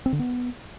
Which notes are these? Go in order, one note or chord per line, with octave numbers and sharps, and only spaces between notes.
C4
D3
B3